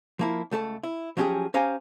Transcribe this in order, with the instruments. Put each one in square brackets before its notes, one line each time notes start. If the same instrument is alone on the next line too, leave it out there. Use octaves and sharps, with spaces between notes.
[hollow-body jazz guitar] F3 A#3 E4
C#2 A3 A4 A5
E4
F3 F#3 C#4 E4 G4 G#4
C#4 G4 C5 F5 G#5 A#5